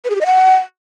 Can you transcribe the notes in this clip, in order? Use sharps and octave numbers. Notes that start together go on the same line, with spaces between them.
B4
G#4
G4
D#5
F#5